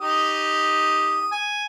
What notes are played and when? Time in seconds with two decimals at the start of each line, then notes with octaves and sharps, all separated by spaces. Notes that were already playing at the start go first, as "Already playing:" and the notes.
0.01 D#4 G4 D#6
1.32 G#5